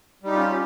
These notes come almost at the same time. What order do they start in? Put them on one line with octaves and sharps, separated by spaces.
G3 D#4 G4 F4 C#4